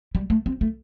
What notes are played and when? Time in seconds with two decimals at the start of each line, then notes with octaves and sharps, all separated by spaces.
0.15 G3
0.30 A3
0.46 C4
0.61 A3